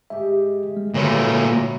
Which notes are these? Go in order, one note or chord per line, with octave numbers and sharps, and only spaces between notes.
G#2 G4 E5
G#3
A#2 D3 F#3 G#3 A3 B4 C#5